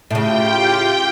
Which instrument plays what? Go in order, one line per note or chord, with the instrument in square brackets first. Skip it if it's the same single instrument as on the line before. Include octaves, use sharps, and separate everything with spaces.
[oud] A2 C#3 [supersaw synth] F4 G4 [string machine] G5